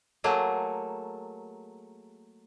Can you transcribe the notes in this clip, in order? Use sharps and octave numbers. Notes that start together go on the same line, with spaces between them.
F#3 A3 A#3 G#4